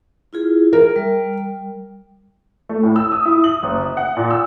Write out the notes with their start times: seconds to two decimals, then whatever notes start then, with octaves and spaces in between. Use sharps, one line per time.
0.33 E4 F4 G#4
0.73 A#4 E5
0.96 G3
2.69 A3
2.83 A2
2.96 E6
3.12 D#6
3.25 E4
3.44 F#7
3.63 F#1
3.82 E5
3.97 F#5
4.17 A#2
4.31 E6